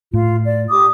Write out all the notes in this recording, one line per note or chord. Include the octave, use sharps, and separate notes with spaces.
A2 F4
D5
G4 D6 D#6